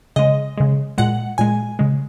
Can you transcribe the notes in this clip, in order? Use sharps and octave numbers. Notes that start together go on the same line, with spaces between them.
C#3 G#3 D#5
C#3 G#3
A#2 G#3 F#5
A#2 G#3 G#5
C#3 G#3